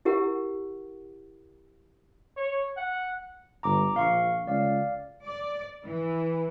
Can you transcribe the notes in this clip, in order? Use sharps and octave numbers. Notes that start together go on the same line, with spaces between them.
E4 G4 A#4 F#5
C#5
F#5
G1 A#5 D6
A#1 F5 C#6
C#2 D5 F5
D5
E3